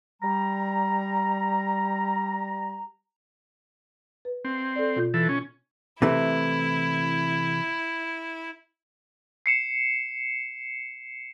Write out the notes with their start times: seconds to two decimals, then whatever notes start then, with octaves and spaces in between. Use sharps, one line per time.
0.21 G3 A#5
4.25 B4
4.45 C4
4.76 A4 D5
4.96 B2 F4 G6
5.14 E3 A4
5.29 C#4
6.02 C3 E3 A3 E4
9.46 C7 C#7 E7